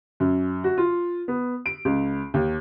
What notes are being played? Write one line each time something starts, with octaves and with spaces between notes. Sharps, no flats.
F#2
F#4
F4
B3
D7
C#2
D#2